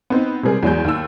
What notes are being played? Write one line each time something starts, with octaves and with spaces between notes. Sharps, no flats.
B3 C4 D#4
C3 G3 G#3 G#4 A#4
E2 F#3 G#3 G6
D#2 E6